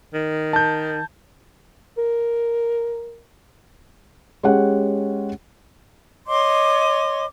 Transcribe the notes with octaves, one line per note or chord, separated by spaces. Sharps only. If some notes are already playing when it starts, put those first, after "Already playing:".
D#3
A5 G6
A#4
G#3 C#4 G4 F#5
C#5 D#5 C6 D6